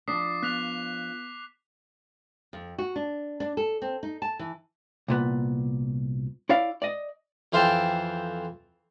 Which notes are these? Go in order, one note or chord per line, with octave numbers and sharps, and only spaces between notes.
F3 D4 D6 D#6 B6 C7
B3 F#6 B6 F7
F2
F#4
D4
D4
A4
C4
D#4
A5
E3
C2 A#2 B3
E4 C#5 D5 F5
D5 D#5
F2 E3 C5 F5 G5 A5